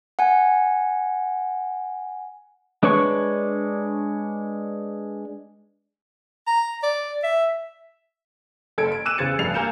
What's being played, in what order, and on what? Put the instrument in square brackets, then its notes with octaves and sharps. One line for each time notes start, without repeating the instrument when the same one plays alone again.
[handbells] F#5 G#5
[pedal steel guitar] G#3 D4 B4 C#5 C#6
[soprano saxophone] A#5
D5
E5
[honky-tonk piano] F#1 A4 G#6 D7
D7
D6 E6 F#6 D#7 E7
E2 C#3 C5 G#6 A6 C#7
F1 G2 C7 C#7 F7
A#3 G#5 G6 C#7 E7